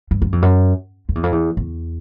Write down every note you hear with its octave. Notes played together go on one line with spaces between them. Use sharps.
G2
F#2
F2
F#2
F2
E2
F2
E2
E2